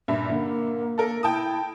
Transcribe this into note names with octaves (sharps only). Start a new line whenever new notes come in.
G2 A#2 E5
D3 A#3
A4 A#4
E4 G5 A5 D#6